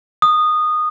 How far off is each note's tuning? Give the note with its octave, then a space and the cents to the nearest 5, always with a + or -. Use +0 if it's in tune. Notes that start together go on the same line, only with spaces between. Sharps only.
D#6 -15